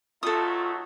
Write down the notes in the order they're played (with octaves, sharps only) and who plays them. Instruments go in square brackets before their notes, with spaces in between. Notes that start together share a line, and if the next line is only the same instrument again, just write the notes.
[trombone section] B1 F#3 A3 [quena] F4 [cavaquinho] A4 D#6